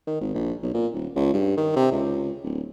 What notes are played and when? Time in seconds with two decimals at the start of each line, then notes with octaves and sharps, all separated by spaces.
0.07 D#3
0.21 G#1
0.34 A#1
0.63 B1
0.74 A#2
0.94 D#1
1.16 C#2
1.34 G2
1.57 D#3
1.76 C3
1.92 C#2
2.44 D1